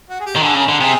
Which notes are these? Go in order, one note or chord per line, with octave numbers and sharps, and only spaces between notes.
F#4
G#4
G4
D#3
D3 G#4
C#3
A#4
D3
C3 G#4